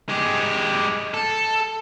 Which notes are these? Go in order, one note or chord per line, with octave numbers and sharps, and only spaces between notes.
G#3 G4
A4